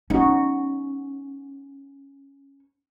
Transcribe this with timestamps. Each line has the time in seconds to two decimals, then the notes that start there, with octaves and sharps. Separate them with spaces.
0.10 C#4 D#4 F#4